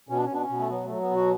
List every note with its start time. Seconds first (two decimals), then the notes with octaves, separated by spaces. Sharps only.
0.09 B2 C#4
0.16 D4
0.25 C#4
0.29 B2
0.34 D4
0.42 C#4
0.49 B2
0.59 A3
0.69 F#3 B3
0.85 F#3 A3
1.00 B3
1.11 B2 F#4